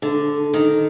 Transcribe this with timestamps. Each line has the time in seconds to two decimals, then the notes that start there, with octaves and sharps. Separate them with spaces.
0.02 D3
0.54 D#3